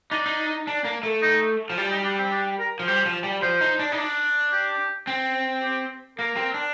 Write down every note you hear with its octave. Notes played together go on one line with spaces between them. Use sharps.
D4 D#4
D#4
D4
A#3
A3
D#4
F3
G3 F4
D#4
D4
C4
D4
A#4
F3
G3 C5
F3
G3
F3 C5
D#4
D4
D#4
D4
G4
C4
G4
A#3 A#4
C4
D4